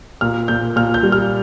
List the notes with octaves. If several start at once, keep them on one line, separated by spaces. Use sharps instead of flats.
A#2 F6
A#2 G6
A#2 F6
G6
G3
F6